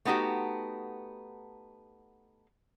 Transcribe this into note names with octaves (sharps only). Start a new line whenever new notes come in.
A3 B3 D#4 F#4 G4